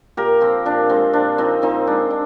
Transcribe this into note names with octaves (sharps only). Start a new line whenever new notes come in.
A#2 G4 A#4
F3 C4
A#2 D4
G#3 C4
A#2 D4
F3 C4 D#4
A#2 C4 D#4
G#3 D4
D4